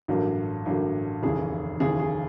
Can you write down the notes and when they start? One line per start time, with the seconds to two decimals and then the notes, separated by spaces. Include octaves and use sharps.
0.08 A1 G2 D3 F#3 A#3
0.66 A1 G2 D3 F#3 A#3
1.23 F1 D#2 C#3 E3 G#4
1.80 F1 D#2 C#3 E3 G#4
2.00 G#4